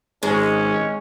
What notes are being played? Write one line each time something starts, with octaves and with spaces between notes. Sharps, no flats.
G#1 G#2 G#3 C#4